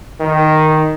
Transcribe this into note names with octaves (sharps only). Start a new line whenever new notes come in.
D#3